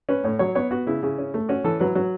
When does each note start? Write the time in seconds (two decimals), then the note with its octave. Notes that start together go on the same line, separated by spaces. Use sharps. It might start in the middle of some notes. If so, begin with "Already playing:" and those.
0.09 C#4 B4
0.24 A2 C#5
0.39 F#3 C#5
0.55 B3 C#5
0.71 B3 F#4
0.87 C#3 E4
1.03 C#3
1.18 C#4
1.34 A3
1.49 C#4 F#4
1.64 E3 A4
1.80 F#3 B4
1.95 F#3